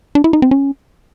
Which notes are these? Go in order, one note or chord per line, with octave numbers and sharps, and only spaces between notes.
D4
E4
D#4
C4
C#4